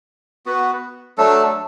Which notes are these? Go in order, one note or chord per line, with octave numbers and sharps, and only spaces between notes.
B3 F#4 B4
F#3 A3 D4 A4